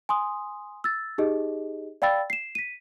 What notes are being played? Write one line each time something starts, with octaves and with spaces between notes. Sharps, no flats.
G#5 C6 D#6
E6 A6
D#4 G4 G#4 D#5
D5 F5 G5 B5 E6 A6
C7 E7
B6 D#7